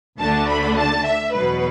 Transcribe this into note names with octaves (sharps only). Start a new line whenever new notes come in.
D2 D3 A3 D4 A5
B5
A5
E5
E2 B2 F#3 B4